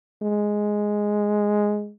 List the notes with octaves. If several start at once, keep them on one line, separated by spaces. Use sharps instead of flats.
G#3